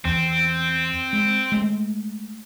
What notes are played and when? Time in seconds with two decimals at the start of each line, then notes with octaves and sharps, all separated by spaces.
0.05 E2 C4
1.13 G#3
1.52 G#3 A3